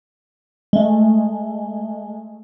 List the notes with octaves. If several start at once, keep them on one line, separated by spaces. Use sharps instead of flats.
G#3 A3